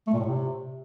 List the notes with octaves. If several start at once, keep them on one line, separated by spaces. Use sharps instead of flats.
A3
A#2
A2
C3